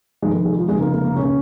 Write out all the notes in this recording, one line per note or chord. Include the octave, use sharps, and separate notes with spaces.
F1 F2 D#3 G#3
G#3
F3
F1 F2 C#3 G#3
A#3
A#3
A#3
C#2 C#3 C#4